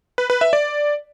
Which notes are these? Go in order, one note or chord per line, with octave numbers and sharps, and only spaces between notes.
B4
B4
E5
D5